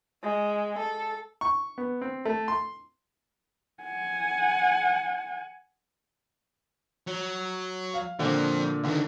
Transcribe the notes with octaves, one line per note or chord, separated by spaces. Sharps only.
G#3
A4
C#6
B3
C4
A3
C6
F#5 G#5
F#3
F5
A#2 D3 F3 C4
C#2 D3 D#3